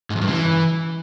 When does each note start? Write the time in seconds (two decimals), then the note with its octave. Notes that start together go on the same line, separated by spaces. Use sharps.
0.10 G#2
0.16 F2
0.21 G2
0.27 C#3
0.33 E3